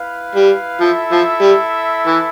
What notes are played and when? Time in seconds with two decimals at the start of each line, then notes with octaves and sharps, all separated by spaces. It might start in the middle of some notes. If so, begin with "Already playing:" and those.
Already playing: E4 B4 F5
0.35 G3
0.81 F3 E4 A4 E5
1.12 F3
1.41 G3
2.07 E3